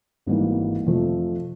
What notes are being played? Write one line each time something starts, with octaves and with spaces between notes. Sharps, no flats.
G#1 G#2 E3 G3 A#3
F2 C3 F3 A3